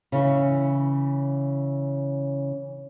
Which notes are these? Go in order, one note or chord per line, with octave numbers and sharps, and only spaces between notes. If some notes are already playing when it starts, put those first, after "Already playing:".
C#3 E3 C#4